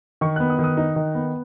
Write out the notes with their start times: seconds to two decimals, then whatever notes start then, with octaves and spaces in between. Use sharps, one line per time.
0.21 D#3 C#6
0.36 B3 F#6
0.50 D#6
0.59 D#3
0.64 D#6
0.77 D#4
0.96 D#3
1.15 B3